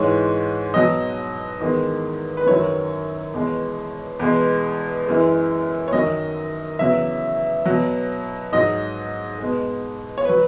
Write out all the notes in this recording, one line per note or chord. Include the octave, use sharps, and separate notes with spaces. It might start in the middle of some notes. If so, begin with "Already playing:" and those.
Already playing: G#2 E3 G#3 C#5
B2 F#3 D#5
E2 D#3 G#3
B4
F#2 D#3 F#3 C#5
E2 B2 G#3
E2 B2 G#3
F#2 E3 G#3
C#5
F#2 D#3 F#3 D#5
E2 C#3 F#3 E5
B2 F#3
G#2 F#3 D#5
B2 G#3
C#5
F#3 B4